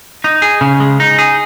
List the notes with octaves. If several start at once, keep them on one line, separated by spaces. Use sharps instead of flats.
D#4
G#4
C#3
G#3
D#4
G#4